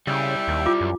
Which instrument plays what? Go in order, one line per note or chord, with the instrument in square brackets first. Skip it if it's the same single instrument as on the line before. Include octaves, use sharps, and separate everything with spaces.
[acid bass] C#3 [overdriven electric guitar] G3 E4 [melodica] E5 G5
[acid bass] D#2
[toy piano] F4 D6
[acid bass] F#2